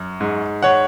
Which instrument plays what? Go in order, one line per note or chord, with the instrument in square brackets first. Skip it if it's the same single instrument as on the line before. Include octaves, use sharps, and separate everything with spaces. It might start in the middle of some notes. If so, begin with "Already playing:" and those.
Already playing: [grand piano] F#2
G#2
C#5 F#5